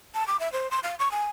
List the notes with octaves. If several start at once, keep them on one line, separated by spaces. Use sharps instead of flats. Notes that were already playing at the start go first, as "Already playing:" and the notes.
A5
D6
E5
C5
C6
F5
C#6
G#5